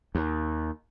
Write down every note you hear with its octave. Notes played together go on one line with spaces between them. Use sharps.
D#2